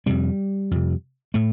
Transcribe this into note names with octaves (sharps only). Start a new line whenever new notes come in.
F2 C3 G3
F2 C3
A2 A3